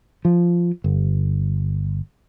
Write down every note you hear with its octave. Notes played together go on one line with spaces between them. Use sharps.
F3
G1